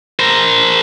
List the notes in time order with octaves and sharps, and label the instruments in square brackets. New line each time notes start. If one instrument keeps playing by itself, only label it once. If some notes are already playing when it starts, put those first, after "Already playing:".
[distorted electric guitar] A#4 C5